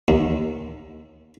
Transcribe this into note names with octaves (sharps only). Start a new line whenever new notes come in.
D#2